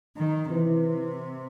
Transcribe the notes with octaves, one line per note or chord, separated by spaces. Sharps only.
D#3
C3 E3